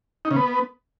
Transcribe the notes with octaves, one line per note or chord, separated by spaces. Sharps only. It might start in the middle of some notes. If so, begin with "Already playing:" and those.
D#4
C#3
B3